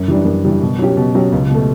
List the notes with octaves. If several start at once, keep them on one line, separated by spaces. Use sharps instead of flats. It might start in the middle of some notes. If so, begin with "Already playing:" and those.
Already playing: F#2
E3 G3 D4
F#2
E3 G3 D4
B2
F#3 C#4 G4
B2
F#3 C#4 G4
C#2
B2 A3